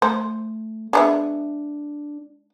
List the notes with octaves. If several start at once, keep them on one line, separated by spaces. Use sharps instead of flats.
A3 C5
G#3 B3 D4 E5